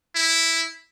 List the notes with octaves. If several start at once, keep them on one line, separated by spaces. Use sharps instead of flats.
E4